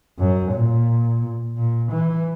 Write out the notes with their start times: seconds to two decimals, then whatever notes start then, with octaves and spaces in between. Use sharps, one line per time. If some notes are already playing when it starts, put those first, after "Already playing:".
0.19 F#2
0.52 A#2
1.57 A#2
1.92 E3